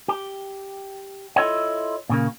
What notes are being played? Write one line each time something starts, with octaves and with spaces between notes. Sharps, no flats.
G4
E4 F4 A4 C#5 D#5 F#5
A#2 C#3 A#3